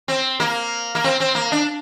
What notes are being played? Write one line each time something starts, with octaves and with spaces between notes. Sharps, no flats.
C4
A#3
A#3
C4
C4
A#3
D4